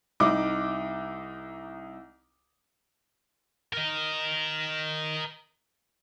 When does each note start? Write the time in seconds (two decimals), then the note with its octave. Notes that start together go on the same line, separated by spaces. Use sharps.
0.20 C2 D#4 D6
3.73 A#4 D#5